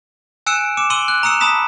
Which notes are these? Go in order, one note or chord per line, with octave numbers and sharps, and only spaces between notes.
G#5 E6 F#6 C#7 D7 E7
D6 C#7 E7
C6 E6 D7 D#7 F#7 G7
F#6
A#5 D#6 E6 C#7 E7
A5 B5 D#6 B6 E7